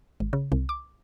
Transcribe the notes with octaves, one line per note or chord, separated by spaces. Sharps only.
G#1
C#3
C2
D6